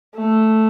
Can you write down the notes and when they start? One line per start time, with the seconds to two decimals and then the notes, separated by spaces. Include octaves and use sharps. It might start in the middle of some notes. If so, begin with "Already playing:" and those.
0.16 A3